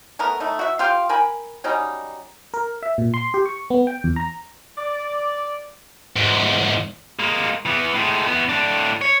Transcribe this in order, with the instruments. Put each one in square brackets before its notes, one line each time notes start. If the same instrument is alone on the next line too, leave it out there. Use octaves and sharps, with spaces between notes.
[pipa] A3 B3 A#4
A3 D#4
F#4 E5
F4 G4 F5 G5
A#4 G5 G#5 B5
F#3 G3 C#4 D#4
[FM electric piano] A#4
E5
A#2
C6
G4
C#6
B3
G5
E2
A#5
[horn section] D5
[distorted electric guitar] E2 G#2
G#3 A#3
E3 B3
A2 G#3
E2 B3
A2 D4
C#5